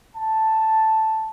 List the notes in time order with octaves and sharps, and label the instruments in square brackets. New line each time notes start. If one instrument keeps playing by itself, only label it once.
[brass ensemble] A5